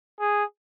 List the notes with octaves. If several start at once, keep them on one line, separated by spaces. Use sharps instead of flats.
G#4